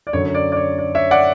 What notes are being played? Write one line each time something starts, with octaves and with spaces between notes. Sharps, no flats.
D5
F#2 D3 F#3 C#5
C#5
D5
D5
C#5
D5
C#5 E5
D5 F#5